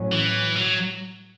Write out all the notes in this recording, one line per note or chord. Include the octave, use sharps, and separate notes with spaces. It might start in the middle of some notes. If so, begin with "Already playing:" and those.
Already playing: A2 F#3 C#4
E3
F#3